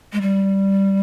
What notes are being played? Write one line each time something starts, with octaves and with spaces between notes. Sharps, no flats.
G#3
G3